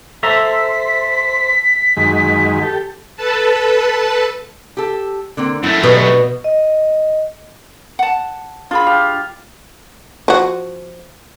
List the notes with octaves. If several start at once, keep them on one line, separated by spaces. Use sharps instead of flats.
A4 C5 E5 A#5 B6
F#2 D#3 G#3
G4 A4
A4 B4 A5
G4 A4
D3 A#3 C4
F#2 A3 E4
B2 D3 G3
D#5
F#5 A5
D4 F4 G#4 B5
G4 F5
F3 F#4